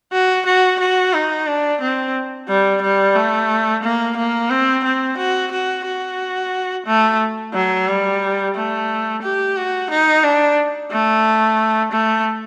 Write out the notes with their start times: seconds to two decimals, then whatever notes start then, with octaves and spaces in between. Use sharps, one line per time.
0.12 F#4
0.46 F#4
0.80 F#4
1.13 D#4
1.47 D4
1.81 C4
2.48 G3
2.82 G3
3.16 A3
3.84 A#3
4.17 A#3
4.50 C4
4.84 C4
5.18 F#4
5.52 F#4
5.86 F#4
6.87 A3
7.54 F#3
7.87 G3
8.55 A3
9.23 G4
9.56 F#4
9.91 D#4
10.24 D4
10.91 A3
11.92 A3